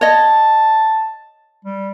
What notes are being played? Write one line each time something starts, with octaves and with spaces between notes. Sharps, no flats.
C#5 D#5 A5
G3